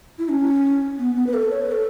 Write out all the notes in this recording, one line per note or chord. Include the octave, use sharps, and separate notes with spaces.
E4
C#4
B3
B3
B4
A4
C#5
B4
A4